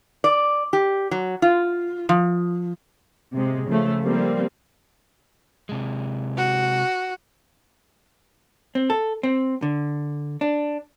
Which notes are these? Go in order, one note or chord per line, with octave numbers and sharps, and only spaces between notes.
D5
G4
F#3
F4
F3
C3 G#3
C#3 F3 A3
F3 G3 A#3 C4
C3 G#3
F#4
C4
A4
C4
D3
D4